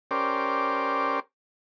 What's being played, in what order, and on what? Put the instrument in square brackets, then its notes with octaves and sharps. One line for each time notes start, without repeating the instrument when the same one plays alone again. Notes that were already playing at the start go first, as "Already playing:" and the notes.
[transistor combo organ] C#4 G4 A#4 C5 D5